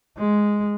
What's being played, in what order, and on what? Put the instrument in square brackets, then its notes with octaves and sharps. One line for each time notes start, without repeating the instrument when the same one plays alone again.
[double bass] G#3